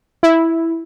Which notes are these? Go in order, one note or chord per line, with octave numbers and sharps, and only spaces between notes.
E4